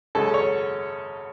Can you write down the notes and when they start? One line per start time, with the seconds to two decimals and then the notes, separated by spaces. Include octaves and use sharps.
0.15 G#1 F#2 C#3 G#3 C#4 A4
0.34 C#5